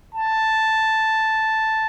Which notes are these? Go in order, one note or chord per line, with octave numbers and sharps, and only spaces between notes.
A5